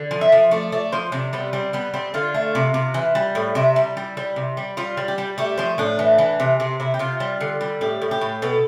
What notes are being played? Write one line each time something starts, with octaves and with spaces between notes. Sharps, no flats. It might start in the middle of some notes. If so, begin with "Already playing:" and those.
Already playing: D3
F3
E5
F3
A3 D5
A3 D5
F3 C5
C3 D4
G3 B3
G3 C4
G3 B3
G3 C4
D3 F4
A3
C3
C3
E3
G3
A2
C3 E4
G3
G3
G3
C3
G3
G3 F4
G3
G4
G3
A3 G4
F3 C5
A2 D4
E3
E3
C3
C3 C4
C3 E4
G4
C3 F4
G3
D3
G3
A2 G4
A2
G4
A2
B2 A4